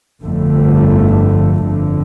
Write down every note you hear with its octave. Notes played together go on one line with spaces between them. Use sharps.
G1 F2 D3 A3
G1 F2 D3